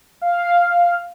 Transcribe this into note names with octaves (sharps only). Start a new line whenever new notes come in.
F5